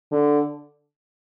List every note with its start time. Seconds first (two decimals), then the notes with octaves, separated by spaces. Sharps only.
0.12 D3